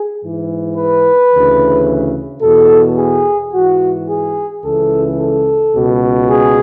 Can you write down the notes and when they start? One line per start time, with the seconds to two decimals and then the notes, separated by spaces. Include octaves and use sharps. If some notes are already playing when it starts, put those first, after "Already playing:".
Already playing: G#4
0.21 G#2 E3
0.77 B4
1.32 D2 C#3 E3
2.42 E2 B2 A4
2.98 G#4
3.53 G#2 E3 F#4
4.09 G#4
4.64 C#2 C#3 E3 A4
5.19 A4
5.75 C#2 B2
6.30 G#4